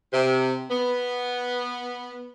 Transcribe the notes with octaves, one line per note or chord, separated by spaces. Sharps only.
C3
B3